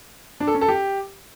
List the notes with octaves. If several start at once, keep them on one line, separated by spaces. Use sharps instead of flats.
D4
A4
C#4
A4
G4